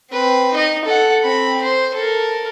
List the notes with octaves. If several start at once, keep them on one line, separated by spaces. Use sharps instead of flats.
C4 B4
D#4 D#5
A4 F#5
C4 B5
C5
A4 A#4